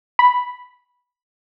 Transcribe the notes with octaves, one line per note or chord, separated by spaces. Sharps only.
B5